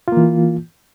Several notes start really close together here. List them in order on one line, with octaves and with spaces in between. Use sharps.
F4 A#3 E3